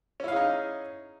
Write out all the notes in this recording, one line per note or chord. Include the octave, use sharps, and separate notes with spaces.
C#4 D#4 E4 G#4 F5